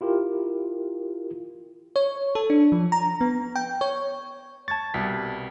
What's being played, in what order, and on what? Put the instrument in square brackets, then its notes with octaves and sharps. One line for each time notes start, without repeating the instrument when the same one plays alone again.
[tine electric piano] E4 F4 G4 A#4
[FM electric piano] C#5
A4
D4
F3
A#5
B3
G5
C#5
[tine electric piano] A5 A6 [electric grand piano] C#6 G#6
[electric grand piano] C2 B2 G3 [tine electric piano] B6